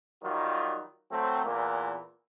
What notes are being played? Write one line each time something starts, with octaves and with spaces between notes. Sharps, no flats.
D#3 F#3 G3 F4
F#3 A3 C4
E2 A#2 E3 A#3